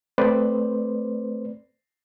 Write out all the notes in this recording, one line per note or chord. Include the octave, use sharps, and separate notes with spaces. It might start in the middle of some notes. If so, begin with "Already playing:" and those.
A3 C4 B4 C5 D5